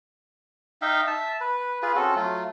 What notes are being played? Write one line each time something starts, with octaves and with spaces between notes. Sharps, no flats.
D#4 E5 F5 G5
E5 A5
B4
F4 G#4 B4
C4 C#4 F#4 A4
F#3 A3 F4